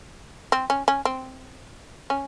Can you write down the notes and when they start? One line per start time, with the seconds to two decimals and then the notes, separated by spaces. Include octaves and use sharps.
0.52 C4
0.70 C#4
0.88 C#4
1.05 C4
2.10 C#4